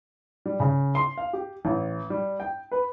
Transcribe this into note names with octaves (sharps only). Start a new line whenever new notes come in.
G3
C#3
C6
F5
G4
A1
G3
G5
B4